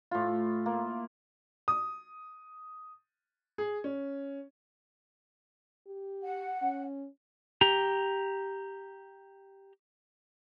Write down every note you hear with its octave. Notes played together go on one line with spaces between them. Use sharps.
A2 F4
A#3
D#6
G#4
C#4
G4
F#5
C#4
G4 A#5